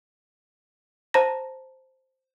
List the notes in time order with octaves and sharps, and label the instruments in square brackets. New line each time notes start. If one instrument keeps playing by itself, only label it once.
[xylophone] C5 A5 A#5 A#6